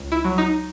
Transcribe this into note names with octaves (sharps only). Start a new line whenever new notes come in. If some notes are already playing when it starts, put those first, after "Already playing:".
Already playing: C#2
E4
F#3
D#4